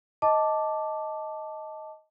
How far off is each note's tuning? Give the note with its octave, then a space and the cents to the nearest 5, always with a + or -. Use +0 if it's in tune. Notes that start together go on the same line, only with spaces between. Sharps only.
D#5 +10 A5 +0 D6 +0